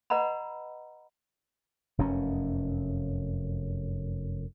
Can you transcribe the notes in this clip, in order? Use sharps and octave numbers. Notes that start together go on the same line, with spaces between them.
B4 D#5 F#5 A#5 B5
F1 F#2 C#4